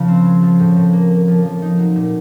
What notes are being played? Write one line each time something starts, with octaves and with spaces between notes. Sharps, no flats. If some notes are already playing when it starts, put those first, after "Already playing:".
Already playing: C#3 F3
C4
G#3
F3
A2
A2
A#3
A#3
F3
F3
D#4
F#3
A#2